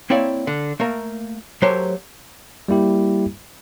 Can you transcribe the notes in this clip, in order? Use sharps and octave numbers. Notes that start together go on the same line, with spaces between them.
A#3 C4 E4 C#5 D5
D3
A3 A#3 A#4
F#3 A3 G4 A#4 C5 C#5
G3 A#3 E4 G4